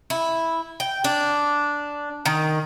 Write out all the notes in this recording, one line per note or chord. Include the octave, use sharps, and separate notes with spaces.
E4
G5
D4
D#3